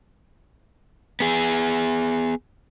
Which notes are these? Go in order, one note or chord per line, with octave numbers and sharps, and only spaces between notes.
B3 G#4